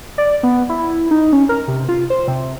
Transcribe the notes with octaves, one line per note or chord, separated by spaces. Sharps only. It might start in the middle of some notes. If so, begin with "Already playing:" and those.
D5
B3
E4
D#4
C#4
A#4
C3
F4
C5
C3